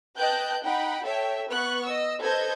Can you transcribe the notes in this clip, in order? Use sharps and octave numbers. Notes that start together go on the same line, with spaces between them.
B4 D#5 G5 A5 F#6 G6
D#4 F#5 G5 B5
A4 C#5 E5 G5
B3 B4 C#6 F#6
D#5 E6
A4 B4 C5 D#5 G6 G#6